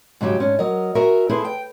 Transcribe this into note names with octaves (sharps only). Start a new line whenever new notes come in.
G#2 C#3 F#3 G4
G#2 C#4 D4
F#3 A#4 D#5
F#4 G#4 A#4 E5
E4 G#4 A4 B4 C5
G5